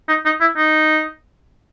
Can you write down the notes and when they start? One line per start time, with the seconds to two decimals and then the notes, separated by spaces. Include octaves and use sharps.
0.09 D#4
0.25 D#4
0.41 E4
0.57 D#4